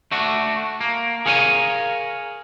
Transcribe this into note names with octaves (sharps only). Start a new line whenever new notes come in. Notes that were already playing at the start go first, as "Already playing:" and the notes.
A3 D4 F#4
A#3
G#4 A#4 C#5 F5 F#5 G#5